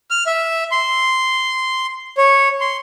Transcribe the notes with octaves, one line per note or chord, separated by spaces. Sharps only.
F6
E5
C6
C#5
C6